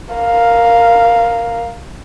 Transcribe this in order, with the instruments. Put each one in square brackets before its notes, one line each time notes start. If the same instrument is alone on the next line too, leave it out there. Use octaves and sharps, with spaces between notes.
[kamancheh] A#4 F5